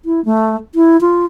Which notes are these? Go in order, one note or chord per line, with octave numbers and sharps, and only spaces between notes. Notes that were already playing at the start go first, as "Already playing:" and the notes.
E4
A3
E4
F4